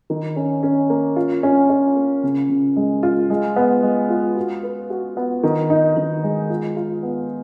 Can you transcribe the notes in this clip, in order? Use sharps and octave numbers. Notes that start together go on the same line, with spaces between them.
D#3
C#4
C#4
A#3
F4
C#4
C#4
A#3
C#3
C#3
G#3
F4
G#3
B3
G#3
F4
F#4
B4
F#4
B3
D#3
D#4
D#3
G#3
F4
F4
B3